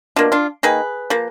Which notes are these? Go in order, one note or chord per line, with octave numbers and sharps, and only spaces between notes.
B2 A#3 D4 F4
D4 F4
D#3 A#3 G#4 B4
F3 A#3